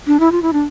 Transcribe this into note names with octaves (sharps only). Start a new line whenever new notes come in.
D4
E4
F4
E4
D4